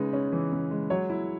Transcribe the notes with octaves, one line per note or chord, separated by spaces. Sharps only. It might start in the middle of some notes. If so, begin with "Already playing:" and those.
Already playing: C#3 G#3 D#4 B4
C#4
E3
C#3
G#3
F#3 C#5
E4